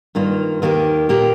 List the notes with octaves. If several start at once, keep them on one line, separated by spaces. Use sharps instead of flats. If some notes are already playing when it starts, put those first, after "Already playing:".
G2 D#3 A#3 F4
D#2 D#3 A#3 G4
A#2 A#3 G4